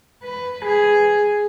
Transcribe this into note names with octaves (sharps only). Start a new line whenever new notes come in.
B4
G#4